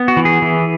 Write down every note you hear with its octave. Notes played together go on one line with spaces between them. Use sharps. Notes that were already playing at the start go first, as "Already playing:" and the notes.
Already playing: B3
F#4
E3
G#4
E3